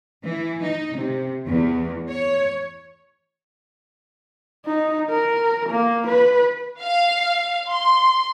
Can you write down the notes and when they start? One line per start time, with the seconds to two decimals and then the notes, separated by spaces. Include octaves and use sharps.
0.25 E3
0.63 D#4
0.97 C3
1.47 E2
2.09 C#5
4.66 D#4
5.10 A#4
5.70 A#3
6.08 B4
6.83 F5
7.70 C6